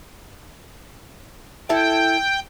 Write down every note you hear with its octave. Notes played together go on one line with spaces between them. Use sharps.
E4 A4 E5 G5